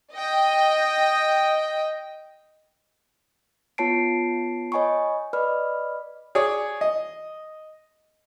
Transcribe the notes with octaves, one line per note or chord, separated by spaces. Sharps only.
D#5 G5
B3 F4 C#5 A5 C7 D7
C#5 D#5 G#5 B5 C#6
B4 D5 D#5 B5 F6
G#4 C#5 D5
D#5